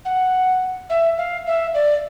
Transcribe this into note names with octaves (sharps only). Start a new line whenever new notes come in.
F#5
E5
F5
E5
D5